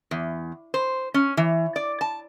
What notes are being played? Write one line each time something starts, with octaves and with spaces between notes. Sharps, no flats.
E2
C5
C#4
E3
D5
A5